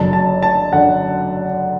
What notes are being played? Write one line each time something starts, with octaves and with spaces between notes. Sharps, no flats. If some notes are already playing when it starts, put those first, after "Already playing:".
Already playing: F#1 F#2 D3 A5
A5
A5
D3 F#5